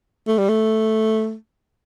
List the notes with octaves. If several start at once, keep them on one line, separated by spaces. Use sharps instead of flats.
A3
G3
A3